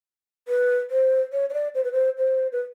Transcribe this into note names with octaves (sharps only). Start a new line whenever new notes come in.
B4
C5
C#5
C#5
D5
C5
B4
C5
C5
B4